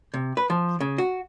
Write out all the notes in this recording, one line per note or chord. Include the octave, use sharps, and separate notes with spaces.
C3
B4
F3
C#3
F#4